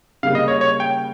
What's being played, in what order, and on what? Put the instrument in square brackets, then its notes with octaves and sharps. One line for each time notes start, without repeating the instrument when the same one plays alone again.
[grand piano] C#3 G3 A#3 [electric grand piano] F5
[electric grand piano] D#5
C#5
C#5
G5